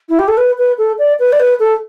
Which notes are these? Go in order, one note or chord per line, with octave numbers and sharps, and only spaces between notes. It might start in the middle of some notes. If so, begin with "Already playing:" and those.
E4
G4
A4
B4
B4
A4
D5
B4
D5
B4
A4